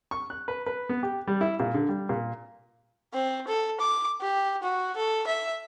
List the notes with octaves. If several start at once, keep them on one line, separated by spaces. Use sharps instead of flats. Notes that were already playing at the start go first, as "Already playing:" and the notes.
C#6
F#6
B4
B4
B3
G4
G3
E4
A#2
D3
G3
A#2
C4
A4
D6
G4
F#4
A4
E5